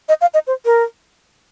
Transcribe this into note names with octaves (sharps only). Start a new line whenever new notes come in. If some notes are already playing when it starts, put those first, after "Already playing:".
D#5
F5
D#5
C5
A#4